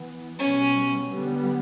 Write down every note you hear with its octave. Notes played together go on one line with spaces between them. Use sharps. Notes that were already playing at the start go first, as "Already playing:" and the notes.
Already playing: E3 B3
B2 G3 B3 C#4
D3 G3 B3